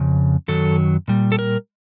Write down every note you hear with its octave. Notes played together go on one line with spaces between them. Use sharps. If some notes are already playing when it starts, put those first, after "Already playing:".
Already playing: F2 C#3
F#2 D#3 F#3 A4
A#2 G3
A4
A#4